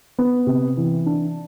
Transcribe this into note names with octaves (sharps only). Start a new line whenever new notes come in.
B3
C3
E3
D4